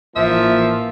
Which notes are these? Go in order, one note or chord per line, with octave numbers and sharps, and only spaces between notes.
A1 A#2 E3 F3 A#3 E5